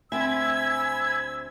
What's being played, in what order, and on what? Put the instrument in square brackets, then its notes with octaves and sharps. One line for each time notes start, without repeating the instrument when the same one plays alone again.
[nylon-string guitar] D2 C4 E5 [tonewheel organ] G#5 B5 G#6 [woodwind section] E6